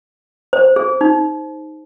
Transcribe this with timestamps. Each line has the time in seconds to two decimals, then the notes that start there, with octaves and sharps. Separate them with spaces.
0.53 C5
0.76 G#4
1.01 D#4